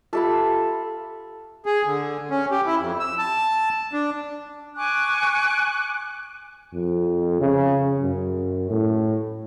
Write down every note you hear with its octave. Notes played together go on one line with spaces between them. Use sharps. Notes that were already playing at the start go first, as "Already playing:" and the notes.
F4 G4 A4 E5 F5 B5
G#4
D3
C#4
G4
E4
F2
E6
A5
D4
G#5 C#6 D6 F#6
F2
C#3
F#2
A2